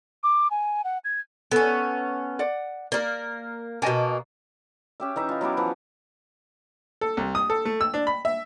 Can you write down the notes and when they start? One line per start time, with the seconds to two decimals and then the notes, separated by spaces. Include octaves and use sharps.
0.23 D6
0.51 G#5
0.84 F#5
1.05 G#6
1.51 B3 C#4 A4
2.39 D5 F#5
2.92 A#3 A#4 D5
3.82 B2 A#3 D#5 G#5 A5
5.00 C#4 G4 E5
5.16 E3 D#4 E5
5.29 D#4 F4
5.41 F#3 B3 E4 G4
5.57 E3 F3 F#4
7.01 A4
7.17 C2
7.35 D#6
7.50 A4
7.65 A3
7.81 E6
7.94 D4
8.07 B5
8.25 E5